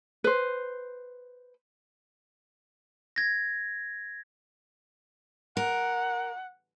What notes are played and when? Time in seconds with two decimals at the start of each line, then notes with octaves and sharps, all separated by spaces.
0.24 B4 C5
3.16 G#6 A#6
5.57 A#4 F#5